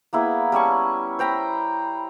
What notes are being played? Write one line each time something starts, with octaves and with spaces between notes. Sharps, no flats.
A#3 B3 E4 G#4
G3 C#4 A5 C#6
C5 G5 A#5 B5